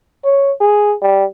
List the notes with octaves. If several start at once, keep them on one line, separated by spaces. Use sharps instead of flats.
C#5
G#4
G3